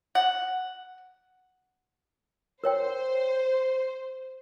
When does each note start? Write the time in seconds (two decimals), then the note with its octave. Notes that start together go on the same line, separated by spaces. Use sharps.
0.15 F#5
2.64 A#4 C5 C#5 G5